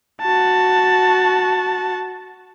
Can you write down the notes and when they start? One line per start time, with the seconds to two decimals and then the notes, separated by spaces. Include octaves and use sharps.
0.22 F#4 A5